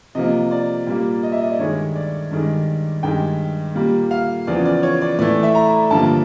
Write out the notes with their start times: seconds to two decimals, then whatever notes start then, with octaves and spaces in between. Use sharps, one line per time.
0.15 C3 F3 A#3 D#5
0.51 D5
0.87 A#2 G3 A#3
1.23 D#5
1.32 E5
1.41 D#5
1.50 D5
1.59 G2 D#3 G#3 C#5
1.96 D5
2.31 G2 D#3 G#3
3.03 G2 D#3 G#3 G5
3.75 A#2 G3 A#3
4.11 F5
4.47 E2 C#3 F3 D5
4.66 D5
4.83 C#5
5.02 D5
5.19 A2 E3 A3 D5
5.43 E5
5.55 A#5
5.91 G2 D3 F3 A#3 A5